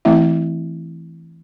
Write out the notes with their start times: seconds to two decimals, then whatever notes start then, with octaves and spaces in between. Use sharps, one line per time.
0.05 E3 A3 C4 E4 E5